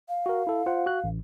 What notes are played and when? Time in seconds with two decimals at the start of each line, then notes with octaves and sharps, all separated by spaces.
0.09 F5
0.26 F#4 A#4
0.47 E4 A4
0.66 F4 C5 F#5
0.86 F#4 F#6
1.04 A1